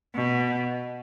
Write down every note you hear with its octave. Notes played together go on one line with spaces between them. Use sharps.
B2